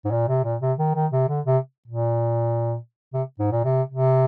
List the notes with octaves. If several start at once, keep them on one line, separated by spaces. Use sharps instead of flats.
G#2
A#2
C3
A#2
C3
D#3
D#3
C3
D3
C3
A#2
C3
G#2
A#2
C3
C3